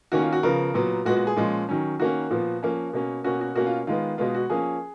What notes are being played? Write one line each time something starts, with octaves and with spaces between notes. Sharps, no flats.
D#3 A#3 C#4 F#4
F4
F#4
C#3 F3 B3 A#4
A#2 F#3 B3
A#2 G#3 B3 F#4
F#4
G#4
A#2 F3 G#3 C#4
D#3 F#3 C#4
D#3 A#3 C#4 F#4
A#2 F3 B3
F3 A#3 C#4
B2 A#3 C#4
B2 A#3 C#4 F#4
F#4
B2 A#3 C#4 F#4
F4
D#3 G#3 B3 F4
B2 G#3 B3 F4
F#4
F3 A#3 C#4 G#4